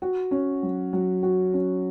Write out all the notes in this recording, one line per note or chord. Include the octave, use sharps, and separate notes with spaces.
F#4
C#4
F#3
F#3
F#4
C#4